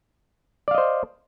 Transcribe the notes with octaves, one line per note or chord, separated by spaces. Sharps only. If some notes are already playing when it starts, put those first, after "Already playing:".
C5 D5 D#5 F5